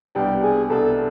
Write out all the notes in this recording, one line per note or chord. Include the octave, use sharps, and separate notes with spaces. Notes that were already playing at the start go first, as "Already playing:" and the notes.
C2 B2 G3 B3 D4 G4
G#4
C2 B2 G3 B3 D4 A4